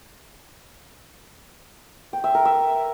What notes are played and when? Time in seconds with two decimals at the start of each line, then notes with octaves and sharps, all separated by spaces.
2.13 G5
2.24 E5
2.35 A#4
2.45 E5